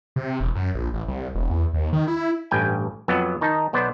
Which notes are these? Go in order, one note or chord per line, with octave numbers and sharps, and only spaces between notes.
C3
E1
F#2
A#1
A1
C2
E1
E2
D#2
D#3
E4
A1 G2 G5 G#5
F2 F#3 B3
D#3 D#4 A5
B1 B3 C5 D5